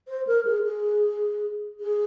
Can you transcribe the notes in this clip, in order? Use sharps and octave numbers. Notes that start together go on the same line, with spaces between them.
C5
A#4
G#4
G#4
G#4